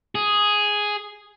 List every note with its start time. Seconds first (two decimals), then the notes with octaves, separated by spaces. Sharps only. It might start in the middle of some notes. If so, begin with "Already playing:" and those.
0.15 G#4